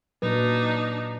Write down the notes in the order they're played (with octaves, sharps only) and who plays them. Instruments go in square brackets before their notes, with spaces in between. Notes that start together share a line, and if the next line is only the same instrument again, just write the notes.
[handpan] A#2 F#3 B4 [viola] D4 D#4